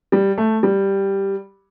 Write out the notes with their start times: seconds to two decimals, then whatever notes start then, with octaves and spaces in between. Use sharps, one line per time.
0.12 G3
0.38 A3
0.63 G3